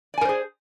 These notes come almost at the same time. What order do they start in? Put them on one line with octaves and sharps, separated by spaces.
D5 G#5 A#4 C5 G#4